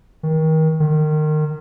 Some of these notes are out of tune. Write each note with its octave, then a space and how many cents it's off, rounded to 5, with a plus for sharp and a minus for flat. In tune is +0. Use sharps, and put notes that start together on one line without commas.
D#3 +30
D#3 -25